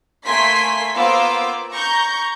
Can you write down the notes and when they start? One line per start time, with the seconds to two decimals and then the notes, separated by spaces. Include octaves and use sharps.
0.25 A3 A#3 G#5 C6 B6
0.93 A#3 B3 F4 C5 D6 E6
1.72 A#5 C#6 G6